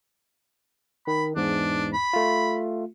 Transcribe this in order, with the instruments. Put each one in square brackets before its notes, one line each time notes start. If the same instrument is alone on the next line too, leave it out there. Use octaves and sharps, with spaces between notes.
[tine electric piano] D#3 [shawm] B5
[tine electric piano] E2 G#2 [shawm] D4
[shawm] B5
[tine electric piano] A3 F4